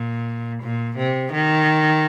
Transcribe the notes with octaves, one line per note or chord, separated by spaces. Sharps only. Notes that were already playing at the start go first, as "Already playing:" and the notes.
Already playing: A#2
A#2
C3
D#3